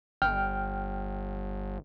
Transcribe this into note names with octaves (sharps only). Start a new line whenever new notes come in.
G1 G5 F6